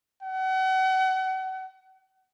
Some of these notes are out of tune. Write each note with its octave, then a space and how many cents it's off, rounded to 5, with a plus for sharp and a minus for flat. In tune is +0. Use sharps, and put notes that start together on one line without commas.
F#5 +35